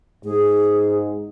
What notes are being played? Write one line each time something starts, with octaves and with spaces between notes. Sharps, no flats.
G#2 G#4